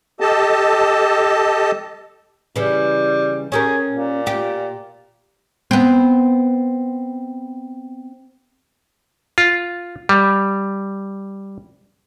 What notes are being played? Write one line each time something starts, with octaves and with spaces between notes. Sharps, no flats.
G4 A4 D#5 A5
C#3 E3 G3
C#4 G4 G#4 A#4
A#2
F4 G4
B3 C4
F4
G3